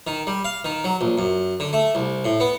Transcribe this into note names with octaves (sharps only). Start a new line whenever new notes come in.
D#3
G3
F5
D#3
F#3
A#1
F#2
D3
A3
C2
A2
B3